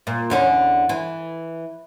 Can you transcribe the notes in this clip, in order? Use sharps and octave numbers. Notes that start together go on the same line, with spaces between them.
A#2
E2 D3 C#4
E3